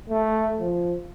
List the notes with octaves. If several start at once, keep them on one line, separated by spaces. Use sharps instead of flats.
A3
F3